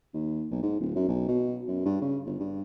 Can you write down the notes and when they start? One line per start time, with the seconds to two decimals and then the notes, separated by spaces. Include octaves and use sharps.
0.14 D#2
0.51 B1
0.63 G#2
0.80 D1
0.96 F#2
1.09 B1
1.28 B2
1.68 F#2
1.85 G2
2.02 C#3
2.27 G1
2.40 G2